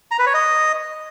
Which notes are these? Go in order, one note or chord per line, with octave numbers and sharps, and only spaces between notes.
A#5
B4
C#5
D#5